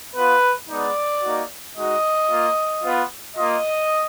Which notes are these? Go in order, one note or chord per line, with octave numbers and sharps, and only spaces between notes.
B3 F4 B4
G#3 B3 D#4 D5
A#3 D#4 F#4
G#3 D#4 F#4 D#5
A#3 F4
B3 F4
A#3 F4 D#5